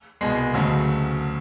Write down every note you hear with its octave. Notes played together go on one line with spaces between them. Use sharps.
C2 B2 G#3
D2 C#3 F#3 A3